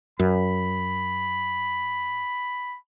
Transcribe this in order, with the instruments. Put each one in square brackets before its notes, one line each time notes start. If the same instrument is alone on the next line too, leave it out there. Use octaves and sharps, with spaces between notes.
[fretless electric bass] F#2 [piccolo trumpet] B5